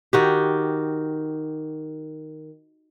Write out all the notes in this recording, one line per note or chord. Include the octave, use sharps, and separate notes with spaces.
D#3 F#4 G4